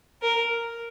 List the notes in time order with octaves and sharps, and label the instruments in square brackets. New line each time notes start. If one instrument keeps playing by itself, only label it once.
[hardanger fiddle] A#4